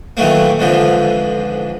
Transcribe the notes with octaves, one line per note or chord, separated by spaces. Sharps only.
A#2 D#3 E3 F#3 A3 A#3
F2 G#2 D3 E3 F3